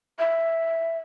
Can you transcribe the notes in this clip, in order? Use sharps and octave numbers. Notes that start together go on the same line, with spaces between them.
E5